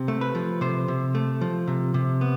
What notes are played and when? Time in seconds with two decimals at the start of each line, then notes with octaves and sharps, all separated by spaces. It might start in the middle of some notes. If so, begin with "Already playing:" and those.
Already playing: C3
0.08 A3
0.21 B4
0.35 F3
0.61 C3 C5
0.88 C3
1.15 A3
1.41 F3
1.67 C3
1.94 C3
2.21 B3